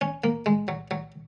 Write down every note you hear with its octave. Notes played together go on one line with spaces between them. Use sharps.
C#4
A#3
G#3
F#3
F#3